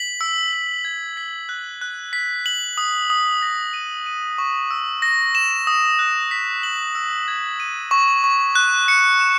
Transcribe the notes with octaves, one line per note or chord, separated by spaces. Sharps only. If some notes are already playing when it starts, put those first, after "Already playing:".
Already playing: B6 F#7
E6
E6
G#6
B6
F#6
F#6
B6
F#7
D#6
D#6
A#6
D#7
D#7
C#6
E6
A#6
E7
D#6
F#6
B6
F#7
E6
G#6
D#7
C#6
C#6
F#6
C#7
E7